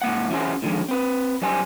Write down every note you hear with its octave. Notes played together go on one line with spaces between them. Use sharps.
G#2 A#3 F#5
E3 C#4 F#4 G#4 C5
A2 D3 D#3 F3 G#3
C4 B4
F#2 G3 C5 G#5 A#5 C6